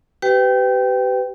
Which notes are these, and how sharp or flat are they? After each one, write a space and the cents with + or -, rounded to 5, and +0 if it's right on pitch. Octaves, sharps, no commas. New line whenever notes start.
G4 -30 B4 +25 G5 +0